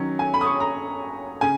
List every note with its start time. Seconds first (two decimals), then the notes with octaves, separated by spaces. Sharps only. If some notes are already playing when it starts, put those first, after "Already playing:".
Already playing: D#3 F#3 C#4
0.19 G#5
0.34 B5
0.41 D#6
0.47 C#6
0.60 A#5
1.41 C#3 G#5